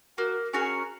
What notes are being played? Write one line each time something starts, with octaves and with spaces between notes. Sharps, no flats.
A#3 F#4
C#4 F#4 G#4 A#4